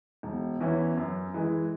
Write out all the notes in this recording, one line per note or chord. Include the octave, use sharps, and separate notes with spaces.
E1
E2 E3 C#4 E4
F#2
E3 G#3